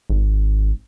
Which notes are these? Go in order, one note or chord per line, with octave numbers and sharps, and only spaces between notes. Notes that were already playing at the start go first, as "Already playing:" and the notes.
G#1